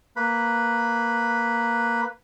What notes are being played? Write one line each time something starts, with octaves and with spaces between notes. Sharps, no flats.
A#3 B4 B5